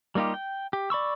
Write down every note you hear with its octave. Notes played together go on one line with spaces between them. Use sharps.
G3 A#3 D#4 F4 G4
G5
G4
D5 B5 C#6 E6